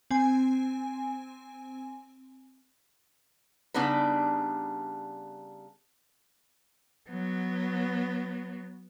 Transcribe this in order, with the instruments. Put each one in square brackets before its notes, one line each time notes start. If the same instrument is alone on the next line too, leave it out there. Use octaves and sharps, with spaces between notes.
[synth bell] C4 G#5
[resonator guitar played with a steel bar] C#3 G3 B3 D4 D#4 B4
[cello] F#3 B3